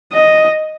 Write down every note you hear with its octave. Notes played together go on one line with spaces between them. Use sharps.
D#5